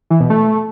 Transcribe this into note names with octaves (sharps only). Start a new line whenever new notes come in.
E3
B2
A3